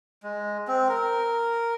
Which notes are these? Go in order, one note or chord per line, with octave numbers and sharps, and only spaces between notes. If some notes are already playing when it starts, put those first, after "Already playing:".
G#3
C4
A#4